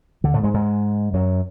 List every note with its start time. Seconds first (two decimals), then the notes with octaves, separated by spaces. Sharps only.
0.24 D2 D3
0.34 A2 A3
0.44 G#2 G#3
0.54 G#2 G#3
1.13 F#2 F#3